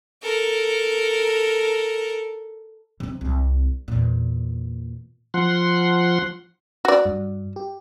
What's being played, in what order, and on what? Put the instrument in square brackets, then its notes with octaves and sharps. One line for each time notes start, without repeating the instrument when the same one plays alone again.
[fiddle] A4 A#4
[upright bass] C3 C4
C2 C3
E2 A#2
[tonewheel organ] F3 F#5 C6
[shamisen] F#4 D5
[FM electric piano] G2
G4